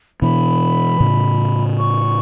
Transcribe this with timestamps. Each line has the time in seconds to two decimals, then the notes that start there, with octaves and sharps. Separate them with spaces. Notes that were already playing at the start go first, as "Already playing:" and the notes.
0.22 B2 E3 B5
1.00 A2 C#3
1.79 C#6